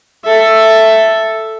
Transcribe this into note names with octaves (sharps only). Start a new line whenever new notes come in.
A4 E5